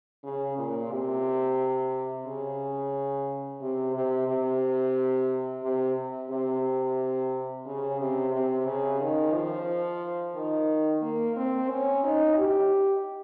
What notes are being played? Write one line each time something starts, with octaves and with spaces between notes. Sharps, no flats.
C#3
A#2
C3
C#3
C3
C3
C3
C3
C3
C#3
C3
C3
C#3
D#3
F3
D#3
A#3
C4
C#4
D#4
G4